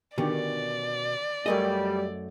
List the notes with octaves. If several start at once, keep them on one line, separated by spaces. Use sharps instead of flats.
B2 D3 D#3 C#4 G4 D5
F#2 G3 A3 G#4 A#4 D#5